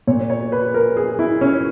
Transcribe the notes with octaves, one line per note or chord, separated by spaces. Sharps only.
A#2 C#5
C#5
B4
A#4
G#4
E4
C#4